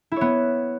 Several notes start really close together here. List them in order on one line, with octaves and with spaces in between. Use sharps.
E4 C#5 B3